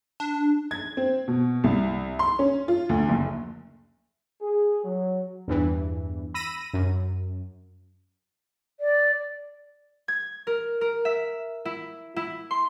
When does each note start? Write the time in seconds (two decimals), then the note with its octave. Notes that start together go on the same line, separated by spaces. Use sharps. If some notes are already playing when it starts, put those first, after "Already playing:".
0.20 D4
0.71 G#6
0.97 C4
1.28 B2
1.64 C2
2.19 C6
2.39 C#4
2.68 F4
2.89 D2
3.09 F#1
4.42 G#4
4.84 F#3
5.48 E2 G2 E3
6.34 B5 E6 A#6 D#7
6.74 F#2
8.80 D5
10.08 G#6
10.47 A#4
10.81 A#4
11.05 E5
11.65 E4
12.16 E4
12.51 C6